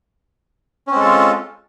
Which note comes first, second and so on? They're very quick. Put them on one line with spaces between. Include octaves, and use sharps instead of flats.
C#4 C4 G#3 A4 F4